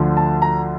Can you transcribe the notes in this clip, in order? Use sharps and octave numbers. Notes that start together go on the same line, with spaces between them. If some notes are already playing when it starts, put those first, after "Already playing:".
Already playing: D2 D3 F3
A5
A#5